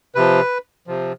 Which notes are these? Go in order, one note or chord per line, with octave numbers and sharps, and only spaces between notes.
C3 F3 B4
C3 F3